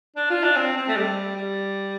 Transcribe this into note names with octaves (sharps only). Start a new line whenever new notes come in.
D4
F4
D4
C4
C4
A3
G3
G3